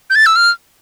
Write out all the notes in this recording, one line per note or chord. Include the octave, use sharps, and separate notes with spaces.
G6
A6
E6
F6